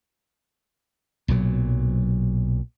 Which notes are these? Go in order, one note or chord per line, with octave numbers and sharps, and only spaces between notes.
B1 A#2 F#3